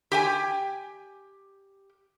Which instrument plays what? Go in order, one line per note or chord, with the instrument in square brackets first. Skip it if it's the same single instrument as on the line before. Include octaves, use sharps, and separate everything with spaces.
[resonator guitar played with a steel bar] G4 G5 G#5